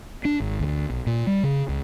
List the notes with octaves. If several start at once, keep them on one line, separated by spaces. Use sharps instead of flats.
D4
G#1
D2
B1
A#2
G3
C#3
C#2